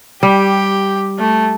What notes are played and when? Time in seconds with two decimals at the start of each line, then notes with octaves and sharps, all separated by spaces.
0.23 G3 G4
1.19 A3